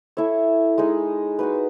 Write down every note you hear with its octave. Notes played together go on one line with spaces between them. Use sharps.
E4 A4 C#5 E5
G#3 D#4 G#4 D#5
D#4 F#4 B4